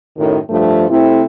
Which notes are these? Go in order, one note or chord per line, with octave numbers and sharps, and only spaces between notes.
F#2 A2 D#3
G2 F3 A3
C3 A3 C4 E4